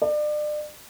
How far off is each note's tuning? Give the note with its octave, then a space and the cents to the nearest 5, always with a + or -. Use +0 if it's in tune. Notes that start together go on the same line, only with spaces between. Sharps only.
D5 +35